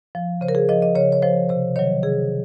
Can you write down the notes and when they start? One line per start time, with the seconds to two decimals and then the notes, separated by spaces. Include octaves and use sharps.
0.15 F3
0.41 C#3 C5
0.48 A#4
0.55 G#4
0.69 F3 D#5
0.82 D#5
0.95 C#3 C#5
1.12 C#5
1.22 F3 C5
1.49 C3 C5
1.76 D#3 F#3 C#5
2.03 C3 G#4